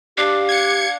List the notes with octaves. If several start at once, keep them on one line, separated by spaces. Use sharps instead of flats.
D4 G4 F5
G#6 C#7